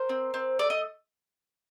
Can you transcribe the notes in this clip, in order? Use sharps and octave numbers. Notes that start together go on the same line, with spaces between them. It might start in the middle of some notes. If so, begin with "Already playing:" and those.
Already playing: A#4 C5
C4
C4
A3 D5
D#5